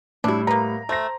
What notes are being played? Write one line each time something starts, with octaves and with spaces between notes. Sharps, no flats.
A2 G3 D4 E4
A#3 B3 A#5
A3 C5 A#6